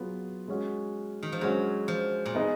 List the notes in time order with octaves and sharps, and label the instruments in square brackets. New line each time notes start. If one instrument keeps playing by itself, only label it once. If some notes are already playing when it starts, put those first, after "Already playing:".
Already playing: [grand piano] F#3 B3 F4 G#4
G#3 C#4 F#4
[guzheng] D#3
F3
[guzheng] F#3 [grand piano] G#3 C#4 F#4
[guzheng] F3
A#2
[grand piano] B3 D#4 G#4